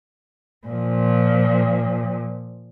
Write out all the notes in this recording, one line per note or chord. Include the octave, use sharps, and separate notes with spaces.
A#2 F3